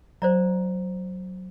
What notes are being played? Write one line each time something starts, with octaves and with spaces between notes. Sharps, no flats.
F#3 C5 D5 A#5